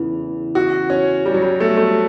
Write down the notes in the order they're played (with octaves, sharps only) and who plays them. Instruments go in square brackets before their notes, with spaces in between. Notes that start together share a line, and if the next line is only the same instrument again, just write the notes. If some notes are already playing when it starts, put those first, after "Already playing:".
Already playing: [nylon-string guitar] E2 C#3 E3 A3
[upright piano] F#4
C#4
G3
F#3
G3
A3
A3